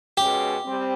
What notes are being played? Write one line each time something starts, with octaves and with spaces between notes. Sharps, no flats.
B2 G#3 C#4 G4
G3 C4